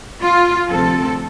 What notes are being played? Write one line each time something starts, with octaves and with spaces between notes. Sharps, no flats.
F4
D2 C3 F3 C4 A4